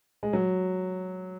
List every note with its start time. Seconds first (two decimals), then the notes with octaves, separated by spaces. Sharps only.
0.23 G#3
0.33 F#3